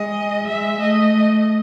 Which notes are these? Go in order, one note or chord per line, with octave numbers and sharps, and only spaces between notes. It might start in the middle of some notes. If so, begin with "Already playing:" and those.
Already playing: G#3 D#5
G#3 E5
A3 D#5